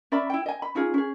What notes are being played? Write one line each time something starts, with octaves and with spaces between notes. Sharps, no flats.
C#4 D5 E5 B5
E4 G5
D#5 G#5
B5
C#4 D#4 F4 G#4
C#4 G#4